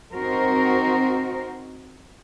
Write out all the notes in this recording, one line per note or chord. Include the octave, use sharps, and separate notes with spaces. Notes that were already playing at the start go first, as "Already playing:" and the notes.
C4 D#4 F#4 A#4 C5